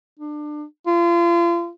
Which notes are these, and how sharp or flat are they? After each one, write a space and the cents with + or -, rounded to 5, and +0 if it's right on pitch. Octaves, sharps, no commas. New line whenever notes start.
D4 +25
F4 -35